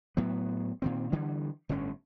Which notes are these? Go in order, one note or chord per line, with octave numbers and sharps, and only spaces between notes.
A2 F#3 B3
A#2 D#3 C4
D3 E3 G3
G1 A2 D3 C#4